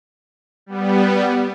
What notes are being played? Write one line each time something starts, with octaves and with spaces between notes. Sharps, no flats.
G3 B3